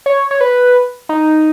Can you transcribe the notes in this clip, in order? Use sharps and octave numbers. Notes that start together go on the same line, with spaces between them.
C#5
C#5
B4
D#4